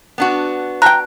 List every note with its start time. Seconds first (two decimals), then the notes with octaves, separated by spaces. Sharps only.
0.18 B3 D4 F#4
0.82 G5 A5 A#5 F#6